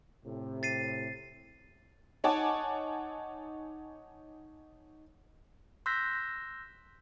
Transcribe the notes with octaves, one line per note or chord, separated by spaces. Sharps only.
A2 C3
A6 C7 D#7
D#4 C#5 F#5 G#5 A5 D6
C6 E6 F#6 G6 A#6 B6